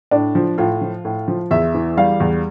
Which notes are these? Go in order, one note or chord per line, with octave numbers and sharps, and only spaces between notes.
A2 D4
F3
A2 F4
F3
A2
F3
E2 E5
E3
G3 F5
E2